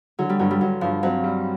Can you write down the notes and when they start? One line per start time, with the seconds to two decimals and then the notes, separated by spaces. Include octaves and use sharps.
0.19 D3 F#3
0.29 G3
0.39 G2 F#3
0.51 G3
0.61 G2 F#3
0.81 G2 F3
1.03 F#3 C4
1.24 G3